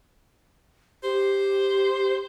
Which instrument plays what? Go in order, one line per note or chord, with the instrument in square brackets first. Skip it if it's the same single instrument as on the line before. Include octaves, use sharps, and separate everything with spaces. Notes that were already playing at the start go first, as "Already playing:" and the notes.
[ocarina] G4 [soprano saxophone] C5